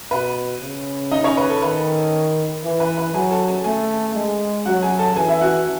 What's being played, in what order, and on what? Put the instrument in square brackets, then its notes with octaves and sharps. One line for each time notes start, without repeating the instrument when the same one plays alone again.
[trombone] B2 [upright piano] B4
[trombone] C#3
[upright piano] D#4 D#5
C#4 C#5
B4
A4
[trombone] D#3 [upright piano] B4
[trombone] E3
[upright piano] B4
B4
[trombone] F#3 [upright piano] G#4 G#5
[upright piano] A4 A5
G#4 G#5
[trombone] A3 [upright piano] G#4 G#5
[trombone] G#3
[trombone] F#3 [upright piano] F#4 F#5
[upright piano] G#4 G#5
A4 A5
[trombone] E3 [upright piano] G#4 G#5
[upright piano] E4 E5
F#4 F#5